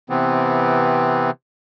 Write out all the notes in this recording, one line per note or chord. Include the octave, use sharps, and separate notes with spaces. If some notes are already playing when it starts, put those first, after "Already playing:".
C3 E3 B3 C4